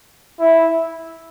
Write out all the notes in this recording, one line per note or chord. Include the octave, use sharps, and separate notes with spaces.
E4